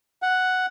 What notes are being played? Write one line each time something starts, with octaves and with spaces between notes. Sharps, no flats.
F#5